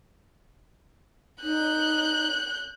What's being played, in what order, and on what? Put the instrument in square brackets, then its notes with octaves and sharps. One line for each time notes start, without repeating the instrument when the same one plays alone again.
[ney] D#4 [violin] F#6 G6